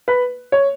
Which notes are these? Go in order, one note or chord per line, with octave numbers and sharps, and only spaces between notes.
B4
C#5